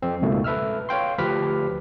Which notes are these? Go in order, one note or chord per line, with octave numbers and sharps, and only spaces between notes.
F2 C4
C#2 G#2 B2 A3 A#3
A4 B4 E5 E6 F6
C#5 F5 G5 C6
D2 F3 G4 B4 F6 B6